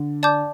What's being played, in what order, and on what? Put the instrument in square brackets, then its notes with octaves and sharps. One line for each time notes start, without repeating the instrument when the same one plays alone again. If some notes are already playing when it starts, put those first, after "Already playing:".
Already playing: [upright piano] D3
[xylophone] D5 A5 D6 G6